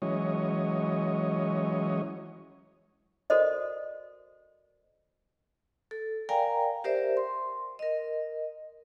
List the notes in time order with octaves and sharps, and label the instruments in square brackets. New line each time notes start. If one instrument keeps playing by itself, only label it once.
[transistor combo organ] E3 F#3 G#3 C#4 C#5 D#5
[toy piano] F#4 A4 A#4 C5 D5 D#5
[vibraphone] A4
A#4 D5 F5 G5 G#5 A#5
G4 A#4 C5 D5 E5
C6
A#4 D#5